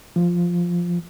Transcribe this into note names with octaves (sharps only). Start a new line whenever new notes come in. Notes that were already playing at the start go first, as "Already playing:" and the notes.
F3